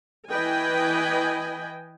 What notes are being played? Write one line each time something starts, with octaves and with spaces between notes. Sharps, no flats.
E3 B4 D#5 G5 G#5